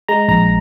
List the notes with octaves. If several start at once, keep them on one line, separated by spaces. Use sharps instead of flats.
G#3 A#5
A#1 A#5